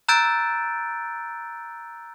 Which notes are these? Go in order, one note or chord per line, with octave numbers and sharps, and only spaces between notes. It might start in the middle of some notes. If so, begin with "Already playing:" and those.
A#5 E6 F#6 G6 A6 D7